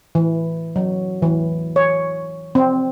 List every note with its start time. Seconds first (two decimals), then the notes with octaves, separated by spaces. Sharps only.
0.15 E3
0.76 F#3
1.22 E3
1.76 C#5
2.55 C4